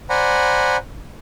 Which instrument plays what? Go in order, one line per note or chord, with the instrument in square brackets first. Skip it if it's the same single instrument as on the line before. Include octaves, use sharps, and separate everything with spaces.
[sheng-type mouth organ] C5 D5 F#5 G#5 A#5 B5